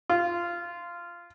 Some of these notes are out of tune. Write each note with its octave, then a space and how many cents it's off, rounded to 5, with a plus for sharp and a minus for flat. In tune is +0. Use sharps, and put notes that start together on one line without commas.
F4 -15